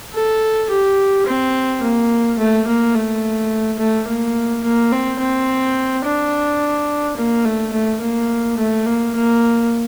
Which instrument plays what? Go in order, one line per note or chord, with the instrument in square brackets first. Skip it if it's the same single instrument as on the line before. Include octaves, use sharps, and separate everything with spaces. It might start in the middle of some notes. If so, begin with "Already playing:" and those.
[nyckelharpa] A4
G4
C4
A#3
A3
A#3
A3
A3
A#3
A#3
C4
C4
D4
A#3
A3
A3
A#3
A3
A#3
A#3